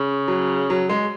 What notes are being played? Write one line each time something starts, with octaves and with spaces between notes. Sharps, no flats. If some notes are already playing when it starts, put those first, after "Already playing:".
Already playing: C#3
F#3
F#3
G#3